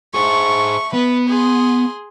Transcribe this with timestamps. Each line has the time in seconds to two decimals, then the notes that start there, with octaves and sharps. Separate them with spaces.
0.14 A3 G#4 C5 C#6
0.94 B3 B4
1.29 G#4 C6